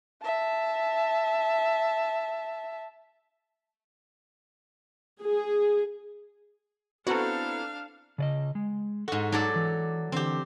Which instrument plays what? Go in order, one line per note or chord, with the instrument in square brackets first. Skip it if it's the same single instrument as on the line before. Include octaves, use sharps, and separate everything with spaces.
[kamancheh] E5 A5
[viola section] G#4
[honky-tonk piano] B3 C4 A4 [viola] D4 F5 [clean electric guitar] E4 A#5 [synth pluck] F#4
[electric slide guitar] C#3 D5 D#5
G#3
[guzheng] G#2 F#4 [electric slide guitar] A4
[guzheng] F#3 A4 D5 [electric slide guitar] D#4
[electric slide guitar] E3
[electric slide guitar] D3 E3 [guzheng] C4 G4